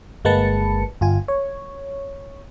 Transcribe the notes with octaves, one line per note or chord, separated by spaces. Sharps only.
G1 G#3 A#3 B4 A5 C#7
G1 F4 G#5
C#5